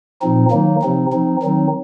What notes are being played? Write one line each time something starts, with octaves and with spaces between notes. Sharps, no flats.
A#2 F3 C4 D#4
D#3 F#3 A#3 D#4
C3 F3 C4 D#4
F3 C4 D#4
D#3 F#3 C4 D#4